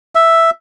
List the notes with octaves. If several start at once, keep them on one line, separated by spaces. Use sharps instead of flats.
E5